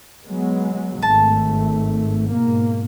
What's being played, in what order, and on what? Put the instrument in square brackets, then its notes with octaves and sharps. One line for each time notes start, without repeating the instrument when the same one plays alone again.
[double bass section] F#3 G#3 B3
[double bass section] G#1 A3 [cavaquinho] A5
[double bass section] G#2 B2 A#3